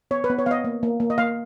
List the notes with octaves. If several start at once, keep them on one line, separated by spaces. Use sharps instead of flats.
B3 C#5
B4
B3
C#5
B3 D#5 F5
A#3
A#3
A#3
D#5
A#3 F5